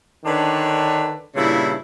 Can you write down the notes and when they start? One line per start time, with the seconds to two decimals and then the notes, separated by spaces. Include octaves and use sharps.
0.25 D3 D#3 D4 B4 C#5
1.36 G2 A#2 C#3 E4